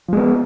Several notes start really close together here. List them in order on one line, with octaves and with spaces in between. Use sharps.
F3 G#3 B3